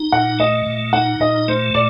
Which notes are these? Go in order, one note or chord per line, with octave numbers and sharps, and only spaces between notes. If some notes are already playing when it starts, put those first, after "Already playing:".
Already playing: D#4
A#2 F#5
A3 D#5
A#2
D#4 F#5
A#2 D#5
A3 C5
A#2 D5